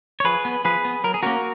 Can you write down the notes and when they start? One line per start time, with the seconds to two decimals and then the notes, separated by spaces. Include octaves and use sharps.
0.20 C#5
0.24 F3 G#4 B4
0.45 B3
0.65 F3 G#4 B4
0.85 B3
1.04 F#3 A#4
1.14 G#4
1.23 A#3 C#4 F#4 A#4